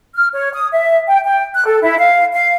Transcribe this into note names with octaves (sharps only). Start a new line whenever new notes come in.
F6
C#5
D#6
E5
G5
G5
F#6
A4
E4
F5
F5